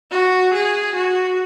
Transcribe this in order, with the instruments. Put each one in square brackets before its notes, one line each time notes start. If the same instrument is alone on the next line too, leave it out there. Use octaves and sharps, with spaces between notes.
[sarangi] F#4
G#4
F#4